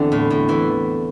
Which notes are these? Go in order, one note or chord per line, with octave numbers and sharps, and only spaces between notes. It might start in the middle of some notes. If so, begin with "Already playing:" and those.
Already playing: E2 D3 C4 D4
A2
A2
E3